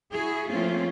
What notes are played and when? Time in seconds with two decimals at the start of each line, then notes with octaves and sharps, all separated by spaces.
0.13 E4 F#4 G#4
0.47 F3 A3 A#3 C4 C#4 F4